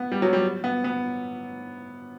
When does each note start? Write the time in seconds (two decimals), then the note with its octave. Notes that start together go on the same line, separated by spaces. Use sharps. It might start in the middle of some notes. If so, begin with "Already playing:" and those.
Already playing: B3
0.12 G3
0.22 F#3
0.33 G3
0.64 B3
0.84 B3